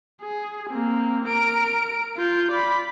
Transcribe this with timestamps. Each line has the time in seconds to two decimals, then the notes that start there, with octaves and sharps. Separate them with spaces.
0.21 G#4
0.70 A#3 C4
1.25 A#4 D7
2.17 F4 G6
2.51 D5 B5